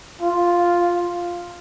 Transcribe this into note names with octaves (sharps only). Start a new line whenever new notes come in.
F4